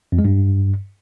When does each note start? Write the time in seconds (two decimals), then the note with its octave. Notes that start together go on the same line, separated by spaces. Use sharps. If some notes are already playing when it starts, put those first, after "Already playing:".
0.12 F2
0.18 G#3
0.25 G2